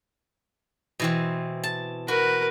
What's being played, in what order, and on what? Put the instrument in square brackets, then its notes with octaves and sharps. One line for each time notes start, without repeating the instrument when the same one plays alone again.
[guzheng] B2 E3 C4
A5
[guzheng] F#4 [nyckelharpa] A#4 B4